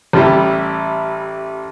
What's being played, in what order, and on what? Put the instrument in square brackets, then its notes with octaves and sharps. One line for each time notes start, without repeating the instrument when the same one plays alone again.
[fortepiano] A1 G3 E4 G4